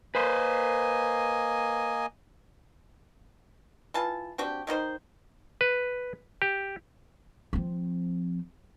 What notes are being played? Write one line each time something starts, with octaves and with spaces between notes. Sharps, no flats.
A#3 B4 C5 D#5 G#5
E3 F4 A5
C4 D4 F#4 G4
D#3 D#4 F#4 C5
B4
G4
F3 C4